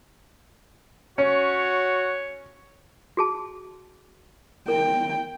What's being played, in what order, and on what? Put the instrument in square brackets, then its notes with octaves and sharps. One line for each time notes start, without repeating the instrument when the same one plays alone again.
[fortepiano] C#4 [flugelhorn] F#4 [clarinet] C#5
[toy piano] F#4 G#4 A5
[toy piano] A#4 [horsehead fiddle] G5